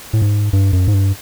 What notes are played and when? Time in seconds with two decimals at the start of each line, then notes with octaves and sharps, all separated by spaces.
0.13 A2
0.22 G#2
0.53 G2
0.73 F#2
0.88 G#2
0.94 G2